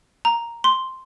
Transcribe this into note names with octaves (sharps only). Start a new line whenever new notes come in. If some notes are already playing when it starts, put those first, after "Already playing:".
A#5
C6